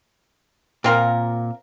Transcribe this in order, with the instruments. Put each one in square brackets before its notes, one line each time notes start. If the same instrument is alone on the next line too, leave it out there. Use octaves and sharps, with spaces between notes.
[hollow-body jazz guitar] A#2 [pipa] C4 F4 A#4